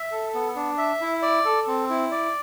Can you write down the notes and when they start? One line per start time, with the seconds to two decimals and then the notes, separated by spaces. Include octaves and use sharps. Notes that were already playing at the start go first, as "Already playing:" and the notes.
Already playing: E5
0.12 A4
0.34 B3
0.56 D4
0.78 E5
1.01 E4
1.22 D5
1.45 A4
1.67 C4
1.90 E4
2.11 D5